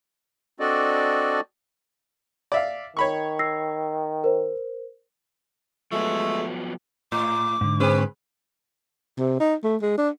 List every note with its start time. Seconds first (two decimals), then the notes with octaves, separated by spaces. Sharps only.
0.60 C4 D4 F#4 A4 D5 D#5
2.52 D5 E5 F5
2.97 D#3 C#5 B5 C#6
3.39 E6 A#6 C7
4.24 A#4 C5
5.92 F3 F#3 G#3 A3 B3
7.12 A2 D6
7.61 G#2 D3
7.80 C4 G#4 B4
9.18 C3
9.40 D#4
9.64 A3
9.82 G#3
9.97 D4